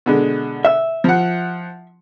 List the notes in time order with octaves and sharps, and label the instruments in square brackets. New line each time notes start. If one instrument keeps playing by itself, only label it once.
[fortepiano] B2 D3 G#3
[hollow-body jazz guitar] E5
[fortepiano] F3 F#5